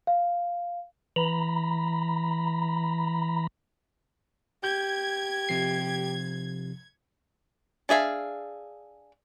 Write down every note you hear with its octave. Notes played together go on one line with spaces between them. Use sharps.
F5
E3 A#5 B5
G4 G6 G#6
C3 F3 C7
D4 G#4 E5 F5